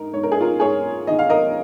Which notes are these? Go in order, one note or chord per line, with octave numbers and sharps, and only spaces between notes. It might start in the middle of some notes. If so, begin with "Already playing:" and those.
Already playing: G#2 D#4 A#4
G#2 C#5
A#4
G#4
F4 A#4
G#2 G#4 C#5
D#3 D#5
F5
A#4 D#5